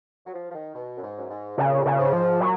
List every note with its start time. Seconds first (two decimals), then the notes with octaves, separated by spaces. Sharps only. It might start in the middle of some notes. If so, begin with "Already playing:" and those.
0.27 F#3
0.34 F3
0.50 F3
0.54 D#3
0.75 B2
0.97 F#2
1.02 G#2
1.18 F#2
1.30 G#2
1.58 A#2 C#3
1.86 C#3
1.98 G#2
2.13 F3
2.40 A#2 F#3